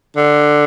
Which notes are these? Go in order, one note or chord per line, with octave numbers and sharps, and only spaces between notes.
D3